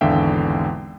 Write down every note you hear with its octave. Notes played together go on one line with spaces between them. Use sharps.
G#1 E2 D3 E5 F5 G5